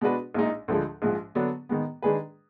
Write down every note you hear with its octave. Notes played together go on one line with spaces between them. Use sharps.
B2 G#3 D4 F#4 B4
A#1 A#2 G#3 D#4
D2 D3 F3 G#3
A#1 G#2 F3 G#3
D3 F#3 B3 D4
D#3 G#3 B3
D#3 G#3 D4 G#4 B4